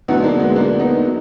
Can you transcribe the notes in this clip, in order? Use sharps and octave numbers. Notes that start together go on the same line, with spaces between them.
D2 D3 F#3 B3 D#4
A#3 D4
G#3 B3
A#3 D4
B3 D#4
F#3